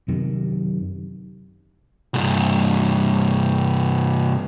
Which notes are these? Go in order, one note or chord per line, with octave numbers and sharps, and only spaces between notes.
F#2 C3 D#3
C2 G2